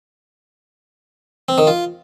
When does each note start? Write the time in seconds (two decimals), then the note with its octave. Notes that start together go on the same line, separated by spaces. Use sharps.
1.49 C4
1.58 D#3
1.67 F4